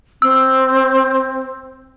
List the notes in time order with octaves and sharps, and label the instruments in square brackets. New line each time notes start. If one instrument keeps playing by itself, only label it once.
[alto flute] C4 [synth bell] E6